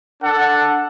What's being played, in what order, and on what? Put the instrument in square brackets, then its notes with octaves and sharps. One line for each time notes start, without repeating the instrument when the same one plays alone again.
[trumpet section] D4 A4 F#5